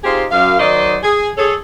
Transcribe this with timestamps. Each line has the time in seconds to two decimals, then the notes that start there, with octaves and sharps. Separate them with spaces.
0.04 C4 D#4 F4 G4 G#4 C5
0.30 F#2 F5
0.59 D#3 F#3 C5 D5 D#5
1.03 G#4
1.37 G#4 A4 C#5